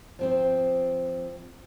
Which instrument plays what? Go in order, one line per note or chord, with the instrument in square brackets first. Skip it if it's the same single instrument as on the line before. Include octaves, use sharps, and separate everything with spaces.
[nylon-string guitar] F3 C4 C5